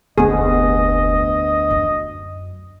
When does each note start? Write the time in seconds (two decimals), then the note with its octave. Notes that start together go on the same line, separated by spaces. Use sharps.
0.18 F1 D2 B3 G#4 D#5
1.70 F#2